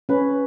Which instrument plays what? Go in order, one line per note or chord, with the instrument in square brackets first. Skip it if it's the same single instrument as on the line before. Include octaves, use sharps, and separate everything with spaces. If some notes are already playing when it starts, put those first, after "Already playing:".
[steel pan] C#4 [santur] B4